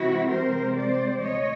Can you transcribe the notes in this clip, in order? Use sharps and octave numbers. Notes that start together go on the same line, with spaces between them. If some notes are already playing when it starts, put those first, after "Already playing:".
Already playing: C3 E3 G#3 C4 E4 F#4
A#4 C5
C5 D5
D2 C3 E3 C#5 D#5